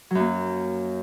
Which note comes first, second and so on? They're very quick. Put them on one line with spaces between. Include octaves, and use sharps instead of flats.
F#3 F#2 A#3